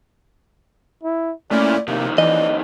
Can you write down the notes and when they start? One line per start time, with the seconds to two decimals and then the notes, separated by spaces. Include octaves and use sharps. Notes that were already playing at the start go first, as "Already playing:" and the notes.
1.03 E4
1.51 A#2 A3 C#4 E4 D5
1.88 F2 C3 D#3 A#3
2.18 E3 D5 D#5